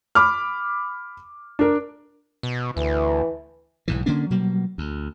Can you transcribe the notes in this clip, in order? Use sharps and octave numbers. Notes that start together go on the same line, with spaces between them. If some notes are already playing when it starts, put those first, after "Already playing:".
B5 D6 F6
D4 A#4
B2
D2 E3
B1 G#2 E3
D3 A#3 C#4 D4
B2 F#3 G3 A#3
D2